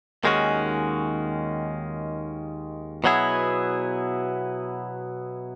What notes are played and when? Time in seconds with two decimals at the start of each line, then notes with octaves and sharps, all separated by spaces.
0.24 D#2 D#3 G#3 C#4 F#4
3.04 B2 F#3 B3 E4 G#4